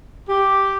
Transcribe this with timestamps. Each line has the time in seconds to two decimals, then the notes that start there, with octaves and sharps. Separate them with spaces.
0.29 G4